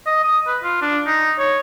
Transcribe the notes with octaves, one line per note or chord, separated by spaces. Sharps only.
D#5
D#6
B4
F4
D4
D#4
C#5